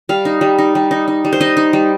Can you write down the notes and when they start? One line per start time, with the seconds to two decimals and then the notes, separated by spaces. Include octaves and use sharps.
0.09 G3 F5
0.25 D#4
0.41 G3
0.58 D#4
0.75 G3
0.91 D#4
1.08 D#4
1.25 G3
1.33 C5
1.41 D#4 D#5
1.57 D#4
1.73 G3